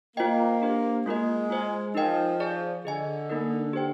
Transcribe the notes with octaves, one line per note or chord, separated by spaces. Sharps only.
A#3 F4 C5 D#5 G5
D4 G4 C5
G#3 A#3 F4 A#4 D#5
F4 C5 D#5 G#5
F3 D#4 A#4 D#5 G5
G#4 D5 G#5
D3 G#4 D#5 G#5
A#3 D#4 A#4
G4 C5 G5